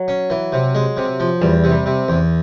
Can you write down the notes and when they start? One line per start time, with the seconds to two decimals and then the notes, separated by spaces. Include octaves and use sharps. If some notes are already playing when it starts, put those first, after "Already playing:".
Already playing: F#3
0.08 C#4
0.30 E3
0.52 C3
0.75 G#3
0.97 C3
1.20 F3
1.41 E2 G3
1.64 C3
1.71 G3
1.86 C3
2.08 E2